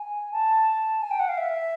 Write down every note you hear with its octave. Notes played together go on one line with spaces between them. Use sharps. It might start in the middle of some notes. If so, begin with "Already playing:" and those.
Already playing: G#5
A5
G#5
G5
F#5
F5
E5